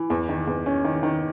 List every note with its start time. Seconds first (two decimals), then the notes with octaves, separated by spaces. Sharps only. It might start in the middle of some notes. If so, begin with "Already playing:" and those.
Already playing: E3
0.10 E2
0.29 D#3
0.47 E2
0.66 C#4
0.85 D#3
1.03 D#3